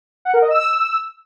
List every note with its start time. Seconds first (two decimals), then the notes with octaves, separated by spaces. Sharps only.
0.25 F#5
0.34 A#4
0.42 D#5
0.50 E6